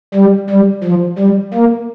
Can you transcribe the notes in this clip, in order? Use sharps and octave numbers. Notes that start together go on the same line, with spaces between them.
G3
G3
F3
G3
A#3